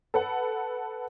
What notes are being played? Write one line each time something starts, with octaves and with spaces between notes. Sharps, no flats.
A4 B4 F#5